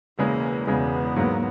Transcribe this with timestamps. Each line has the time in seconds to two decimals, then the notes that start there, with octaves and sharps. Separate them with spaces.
0.19 E1 E2 C#3 G#3 A#3
0.67 E1 E2 C#3 G#3 B3
1.16 G#2 F#3 A#3